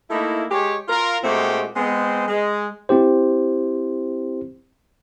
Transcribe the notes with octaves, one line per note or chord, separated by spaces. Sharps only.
A3 A#3 D#4 E4
G#3 G4 C#5
F4 A#4
A#2 G#3 A3 C4 F#4 G4
G#3 B3 C4
G#3
C4 E4 G4 C5